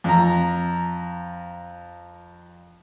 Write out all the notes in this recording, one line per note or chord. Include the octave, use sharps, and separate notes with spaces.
F2 A#5